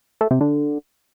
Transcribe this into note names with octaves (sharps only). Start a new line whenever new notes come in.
A3
C3
D3